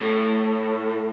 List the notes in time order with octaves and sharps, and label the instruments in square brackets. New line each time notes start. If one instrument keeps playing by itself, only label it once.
[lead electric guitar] A2